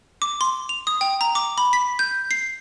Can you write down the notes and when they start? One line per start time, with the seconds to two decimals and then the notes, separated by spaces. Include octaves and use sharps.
0.22 D6
0.41 C6
0.69 F7
0.87 D#6
1.01 G5
1.21 A#5
1.35 D6
1.58 B5
1.73 B6
1.99 G6
2.31 C7